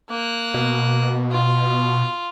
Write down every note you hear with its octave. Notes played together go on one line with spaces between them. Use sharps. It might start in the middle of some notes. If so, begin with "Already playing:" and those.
A#3 F#6
B2
F4